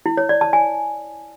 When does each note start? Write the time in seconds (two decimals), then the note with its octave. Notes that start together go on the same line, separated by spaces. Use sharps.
0.06 E4
0.17 C#5
0.29 D5
0.41 A5
0.53 G#5